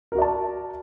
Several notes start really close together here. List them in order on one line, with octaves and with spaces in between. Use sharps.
A#4 F#4 D5 A5